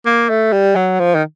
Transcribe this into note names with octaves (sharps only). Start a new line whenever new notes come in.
A#3
A3
G3
F#3
F3
D#3